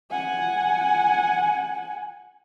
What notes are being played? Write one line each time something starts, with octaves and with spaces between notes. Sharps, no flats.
F#5 G#5